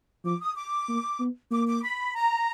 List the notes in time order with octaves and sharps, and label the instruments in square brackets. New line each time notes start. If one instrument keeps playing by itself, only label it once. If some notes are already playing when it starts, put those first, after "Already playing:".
[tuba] F3 [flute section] D6
[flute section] D#6
D6
[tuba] A#3
B3
[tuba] A#3 [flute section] D6
[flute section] D6
B5
A#5